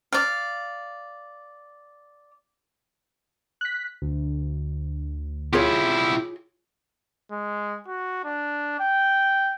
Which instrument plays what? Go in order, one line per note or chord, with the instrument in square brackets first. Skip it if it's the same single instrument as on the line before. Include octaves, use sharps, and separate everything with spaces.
[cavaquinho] D5 F5
[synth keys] F#6 B6
D2
[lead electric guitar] E4 G4 [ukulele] F4 G#4 C#5
[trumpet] G#3
F#4
D4
G5